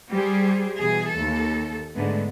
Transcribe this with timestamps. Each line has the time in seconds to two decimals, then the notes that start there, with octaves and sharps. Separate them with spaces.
0.10 G3 G4 G#4 C5
0.79 B2 E3 G#4
1.13 D#2 A4
1.95 G#2 D3 G#3 A3 B3 D4